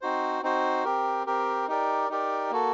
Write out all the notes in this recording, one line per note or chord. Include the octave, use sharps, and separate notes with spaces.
C4 D#4 F#4 C5
C4 D#4 F#4 C5
C4 G4 A#4
C4 G4 A#4
D#4 G4 A#4 D5
D#4 G4 A#4 D5
A#3 F#4 A4